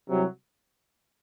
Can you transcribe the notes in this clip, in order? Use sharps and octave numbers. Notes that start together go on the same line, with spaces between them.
C2 C3 F#3